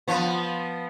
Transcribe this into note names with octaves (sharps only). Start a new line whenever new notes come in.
F3 B3